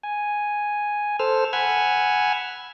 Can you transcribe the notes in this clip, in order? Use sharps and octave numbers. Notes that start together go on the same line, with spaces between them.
G#5
A4 C5 E6 F6
F#5 G#5 B5 E6 F6 G#6